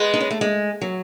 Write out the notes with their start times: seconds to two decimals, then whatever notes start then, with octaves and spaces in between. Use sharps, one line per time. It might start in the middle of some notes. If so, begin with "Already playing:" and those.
Already playing: G#3 B3
0.14 D#4
0.21 C#4
0.31 A3
0.41 G#3
0.81 F#3